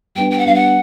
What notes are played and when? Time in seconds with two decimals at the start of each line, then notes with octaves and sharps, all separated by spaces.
0.15 G3 B3 D4 G5
0.30 G5
0.38 F#5
0.45 G3 B3 D4 F5
0.54 F#5